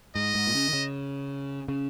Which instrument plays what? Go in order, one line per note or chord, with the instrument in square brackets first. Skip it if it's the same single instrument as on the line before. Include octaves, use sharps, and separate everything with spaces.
[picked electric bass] G#2 [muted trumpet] D#5
[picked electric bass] G#2
A#2
C#3
D#3
C#3
C#3